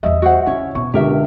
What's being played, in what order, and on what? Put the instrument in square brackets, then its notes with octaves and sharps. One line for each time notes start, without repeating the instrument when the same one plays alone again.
[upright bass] E2 G3 [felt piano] D#5 E5
[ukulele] F#4 C5 F#5
[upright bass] C#3 [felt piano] C#4 [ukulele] E4 C#5
[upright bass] B2 [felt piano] C#6
[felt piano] C#2 D3 [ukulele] G4 A#4 E5